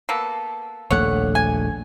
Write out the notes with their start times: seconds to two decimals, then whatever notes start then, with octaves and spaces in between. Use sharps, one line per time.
0.09 A#3 B3 A4
0.91 D#1 A#1 A3 C#5 F#5
1.35 G#5